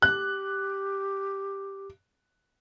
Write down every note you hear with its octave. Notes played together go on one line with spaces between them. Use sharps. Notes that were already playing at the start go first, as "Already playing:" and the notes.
G4 F#6